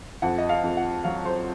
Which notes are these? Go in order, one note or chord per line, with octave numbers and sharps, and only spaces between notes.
F2 F#5
D#5
F5
F2
F#5
F#3 F5
C5